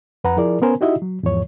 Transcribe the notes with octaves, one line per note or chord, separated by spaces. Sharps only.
F2 B4 F#5 A#5
F3 E4 G#4 A#4 D5
B3 C#4 A#4 C5 G#5
D#4 E4 F#4 G4 D#5 E5
F#3
E2 G#2 F3 C#5